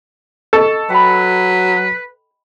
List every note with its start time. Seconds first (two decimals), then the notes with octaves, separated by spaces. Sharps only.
0.53 A4 D#5 C#6
0.90 F#3 B4 G5 B5